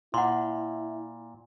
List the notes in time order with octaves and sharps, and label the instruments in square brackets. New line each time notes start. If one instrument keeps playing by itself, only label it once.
[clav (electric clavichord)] A#2 [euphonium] E4 [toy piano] F#5 C6